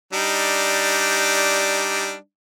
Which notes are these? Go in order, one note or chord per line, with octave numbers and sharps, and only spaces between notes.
G3 D4 D#4